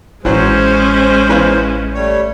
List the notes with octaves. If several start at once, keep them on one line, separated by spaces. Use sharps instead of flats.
A1 E3 F#3 G#3 C#4 C5
E3 B4 F5
G3 A3 C#5